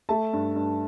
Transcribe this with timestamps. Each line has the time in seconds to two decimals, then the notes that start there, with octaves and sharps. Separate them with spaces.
0.09 A3 E5 A5
0.33 G2
0.56 G2